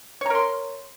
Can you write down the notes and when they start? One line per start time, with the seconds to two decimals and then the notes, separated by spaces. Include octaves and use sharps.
0.21 C#5
0.26 A#5
0.30 A#4
0.35 C6